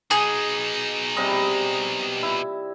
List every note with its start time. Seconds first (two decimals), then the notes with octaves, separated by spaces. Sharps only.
0.11 B2 D#4 G#4
1.17 C3 G3 D#5
2.23 E4